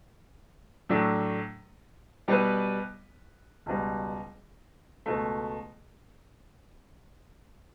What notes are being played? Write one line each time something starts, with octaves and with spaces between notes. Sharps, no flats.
A2 F#3 A3 D4
B2 G3 B3 E4 B4
C#2 B2 G3
C#2 B2 A3